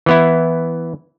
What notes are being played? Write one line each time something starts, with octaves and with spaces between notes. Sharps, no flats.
E3 B3 E4